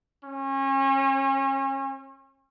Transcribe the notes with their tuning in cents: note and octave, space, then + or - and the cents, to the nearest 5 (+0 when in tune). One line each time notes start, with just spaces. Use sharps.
C#4 -35